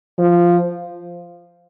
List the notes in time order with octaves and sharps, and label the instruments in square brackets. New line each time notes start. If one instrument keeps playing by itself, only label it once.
[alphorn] F3